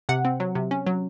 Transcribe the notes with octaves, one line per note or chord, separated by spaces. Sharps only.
C3 F#5
C4
F#3
C3
C#4
F#3